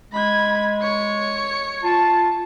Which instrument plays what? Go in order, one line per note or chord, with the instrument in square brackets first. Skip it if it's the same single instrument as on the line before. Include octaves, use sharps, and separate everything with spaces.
[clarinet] G#3 [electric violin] B5 G#6
[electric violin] C#5 C#7
[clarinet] F4 [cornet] A5